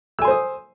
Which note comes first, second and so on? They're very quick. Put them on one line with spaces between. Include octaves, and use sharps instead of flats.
E6 G#5 C6 C5 D#6